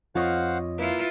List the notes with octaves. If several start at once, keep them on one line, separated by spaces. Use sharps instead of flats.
F2 F4 C5 C#5 D#5 F5 F#5 C#6
A#3 E4 F4 B4